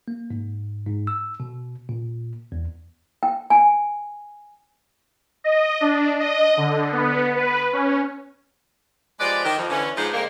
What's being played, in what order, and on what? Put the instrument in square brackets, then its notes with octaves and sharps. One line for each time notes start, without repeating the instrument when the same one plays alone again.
[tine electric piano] A#3
G#2
G#2
E6
B2
A#2
E2
[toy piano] G5
G#5
[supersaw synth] D#5
D4
D#5
D3
B3
B4
C#4
[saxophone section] F3 G#3 G4 B4 D5
D#3 G4
F2
D3 E3 C#4
G#2 F3 D4 D#4 B4 C5
G#2 D3 D#3 A3 A#3